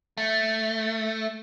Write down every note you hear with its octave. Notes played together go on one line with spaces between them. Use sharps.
A3